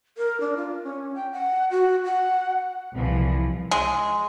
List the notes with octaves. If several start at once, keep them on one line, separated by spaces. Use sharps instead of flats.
A#4
D4
F4
C#4
G5
F#5
F#4
F#5
C2 E3 F3
G#3